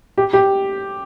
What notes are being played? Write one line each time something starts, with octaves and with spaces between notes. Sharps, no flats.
G4
G4